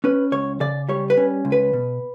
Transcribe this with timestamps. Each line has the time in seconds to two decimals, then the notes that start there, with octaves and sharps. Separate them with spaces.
0.04 C#4 B4
0.32 C#2 C#5
0.61 C#3 D5
0.89 G3 C#5
1.10 B4
1.17 C#4
1.45 C#2
1.52 B4
1.73 B2